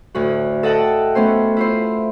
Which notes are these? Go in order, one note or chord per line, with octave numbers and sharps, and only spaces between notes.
D2 A2 F#4
A4 D#5 F#5 G5 A5
A3 B3 C#4 C5
E4 F4 C5